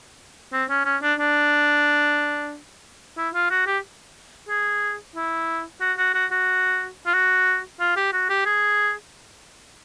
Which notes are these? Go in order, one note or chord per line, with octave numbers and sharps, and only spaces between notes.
C4
C#4
C#4
D4
D4
E4
F4
F#4
G4
G#4
E4
F#4
F#4
F#4
F#4
F4
F#4
F4
G4
F#4
G4
G#4